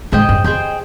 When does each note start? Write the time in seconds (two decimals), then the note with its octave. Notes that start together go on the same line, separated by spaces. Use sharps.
0.12 G#2 G#4 C5 D#5 G5
0.29 G2
0.44 F2 G#4 C5 D#5 G5